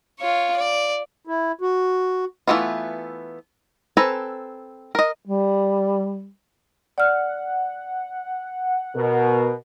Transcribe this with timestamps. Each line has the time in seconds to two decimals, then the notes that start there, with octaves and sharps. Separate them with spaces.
0.19 F4 C#5
0.56 D5
1.27 E4
1.61 F#4
2.47 E3 F#3 A3 B3 F4
3.97 C4 A4 B4 G#5 A#5
4.95 A#4 D#5
5.26 G3
6.98 D5 F#5 F6
8.96 B2 A#4